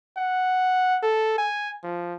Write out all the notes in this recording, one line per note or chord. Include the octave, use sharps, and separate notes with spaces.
F#5
A4
G#5
F3